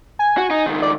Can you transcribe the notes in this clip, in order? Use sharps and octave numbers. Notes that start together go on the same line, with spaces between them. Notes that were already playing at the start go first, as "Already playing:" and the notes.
G#5
F#4
D#4
C#2 D#3
D5